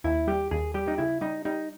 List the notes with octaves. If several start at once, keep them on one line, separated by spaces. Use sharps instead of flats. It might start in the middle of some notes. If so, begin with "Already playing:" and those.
D#2 E4
G3 G4
D#2 G#4
G3 G4
D#4
C#3 E4
G3 D#4
G3 D#4